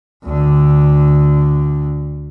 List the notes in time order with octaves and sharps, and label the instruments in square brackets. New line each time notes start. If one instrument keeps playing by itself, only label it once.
[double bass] D2 D3